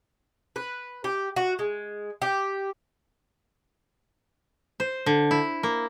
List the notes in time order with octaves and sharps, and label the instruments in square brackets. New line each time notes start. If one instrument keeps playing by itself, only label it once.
[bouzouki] B4
G4
F#4
G#3
G4
[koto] C5
D3
E4
A#3